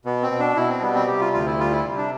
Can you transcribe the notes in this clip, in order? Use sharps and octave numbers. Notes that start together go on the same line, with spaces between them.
B2 B3
C4
B2
D4
B2 E4
C4
G3 B3
C4
C3 G4
F4
D2 F4
E4
G3 F4
E4
C3
D4